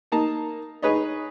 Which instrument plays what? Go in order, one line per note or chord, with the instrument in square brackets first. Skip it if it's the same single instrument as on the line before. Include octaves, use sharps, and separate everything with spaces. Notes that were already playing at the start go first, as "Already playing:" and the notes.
[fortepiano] A#3 D#4 A5 A#5
D#4 G#4 B4 C#5 D#5